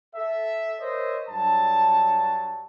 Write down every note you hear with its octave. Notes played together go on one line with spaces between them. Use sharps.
A4 E5
A#4 C5 C#5 D#5 E5
G2 F#3 A5